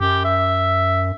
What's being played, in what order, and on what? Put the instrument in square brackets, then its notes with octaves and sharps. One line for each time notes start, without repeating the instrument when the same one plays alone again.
[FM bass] F#2 [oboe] G4
[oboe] E5